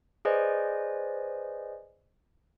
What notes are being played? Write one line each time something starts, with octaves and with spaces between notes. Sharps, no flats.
G#4 B4 C5 D5 D#5 G#5